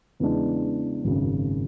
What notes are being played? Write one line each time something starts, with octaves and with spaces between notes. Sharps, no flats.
E2 C#3 E3 G#3 D4
G#1 F#2 C#3